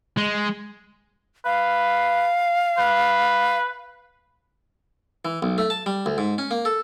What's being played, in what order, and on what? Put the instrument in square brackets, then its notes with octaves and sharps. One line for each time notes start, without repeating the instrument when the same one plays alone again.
[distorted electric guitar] G#3
[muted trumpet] B4 [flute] F5
[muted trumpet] B4
[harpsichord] E3
B1
A3
A5
G3
D2
G#2
C#4
A#3
A4